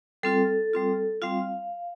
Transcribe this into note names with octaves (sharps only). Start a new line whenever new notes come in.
G3 C4 F4 A4
G3 C4 F4
G3 C4 F4 F5